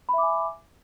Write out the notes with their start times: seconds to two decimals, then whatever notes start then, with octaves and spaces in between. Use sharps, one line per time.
0.09 B5
0.13 E5
0.18 D6
0.23 G#5